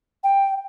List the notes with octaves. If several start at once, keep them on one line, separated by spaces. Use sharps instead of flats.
G5